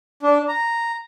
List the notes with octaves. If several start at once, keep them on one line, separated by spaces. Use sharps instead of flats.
D4
A#5